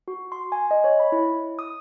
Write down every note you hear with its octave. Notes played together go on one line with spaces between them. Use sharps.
F#4
C6
G#5
D#5
C#5
B5
E4
D#6